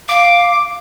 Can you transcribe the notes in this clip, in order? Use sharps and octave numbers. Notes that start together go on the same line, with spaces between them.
F5 D6